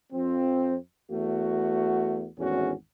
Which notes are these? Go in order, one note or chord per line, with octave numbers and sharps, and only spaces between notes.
F2 F3 C4
E2 A3 F#4
G#1 E2 A2 C#4 F#4